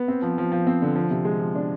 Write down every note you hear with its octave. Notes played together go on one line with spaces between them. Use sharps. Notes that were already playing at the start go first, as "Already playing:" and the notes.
Already playing: B3
C4
F3
F3
F3
C4
D3
F3
C3
G#3
F3
D4